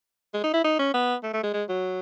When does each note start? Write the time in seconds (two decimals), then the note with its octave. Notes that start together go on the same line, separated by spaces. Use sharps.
0.34 G#3
0.43 D#4
0.53 E4
0.64 D#4
0.79 C#4
0.94 B3
1.23 A3
1.33 A3
1.43 G#3
1.53 G#3
1.69 F#3